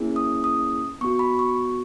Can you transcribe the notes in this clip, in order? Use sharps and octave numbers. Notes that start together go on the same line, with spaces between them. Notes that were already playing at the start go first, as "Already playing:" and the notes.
Already playing: A#3 C#4 E4 G#4
D#6
D#6
B3 F#4 C#6
B5
C#6